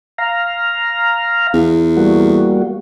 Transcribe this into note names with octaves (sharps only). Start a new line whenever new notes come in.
F5 A#5
E2
G3 A#3 F#4